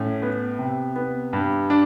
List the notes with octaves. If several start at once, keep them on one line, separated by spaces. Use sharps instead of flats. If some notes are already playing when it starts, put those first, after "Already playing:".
Already playing: A2 C#4
B3
C3
B3
G2
D4